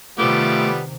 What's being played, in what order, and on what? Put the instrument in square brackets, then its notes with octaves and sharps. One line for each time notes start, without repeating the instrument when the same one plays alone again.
[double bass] C3 D#3 [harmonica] F3 G3 B3 [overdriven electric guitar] A3 [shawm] D6